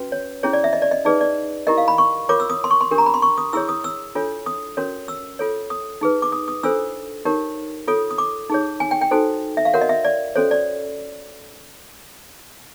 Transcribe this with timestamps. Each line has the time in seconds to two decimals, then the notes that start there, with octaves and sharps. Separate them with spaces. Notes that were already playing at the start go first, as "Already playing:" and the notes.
Already playing: C#4 F#4 B4
0.12 C#5
0.43 C#4 E4 G#4 C#5
0.53 D5
0.64 E5
0.73 D#5
0.82 D5
0.91 D#5
1.05 D#4 G#4 B4 D5
1.21 D5
1.67 E4 G4 A#4 D#5
1.78 F5
1.88 B5
1.98 C#6
2.29 F4 A#4 C#5 D6
2.40 E6
2.50 D#6
2.64 C6
2.71 C#6
2.81 C6
2.91 D4 G4 A#4
2.98 A#5
3.06 B5
3.14 C6
3.22 C#6
3.38 D#6
3.53 E4 G#4 C#5 E6
3.69 D#6
3.84 E6
4.15 D4 F4 A4 C#5
4.46 D#6
4.77 C#4 F#4 A#4 C#5
5.08 E6
5.39 F4 A4 C#5
5.70 D#6
6.01 D#4 G#4 B4
6.22 D6
6.32 D#6
6.48 D#6
6.63 D4 F4 A4 C5 E6
7.25 D#4 G4 A#4 C#5
7.88 F4 A4 C#5 D#6
8.10 D#6
8.18 D6
8.50 D#4 G#4 C#5
8.80 G#5
8.91 G5
9.01 G5
9.11 D#4 F#4 A4 C5
9.57 E5
9.65 F5
9.74 F#4 A#4 C#5 F#5
9.81 D#5
9.89 E5
10.05 D5
10.36 C#4 F#4 A4 C5 C#5
10.51 D5